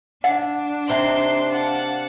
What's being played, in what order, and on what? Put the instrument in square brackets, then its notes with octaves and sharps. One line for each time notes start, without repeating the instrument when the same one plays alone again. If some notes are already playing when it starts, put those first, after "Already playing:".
[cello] D4 [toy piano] F#5
[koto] C3 [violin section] D#4 C6
[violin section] F5 F#5 A5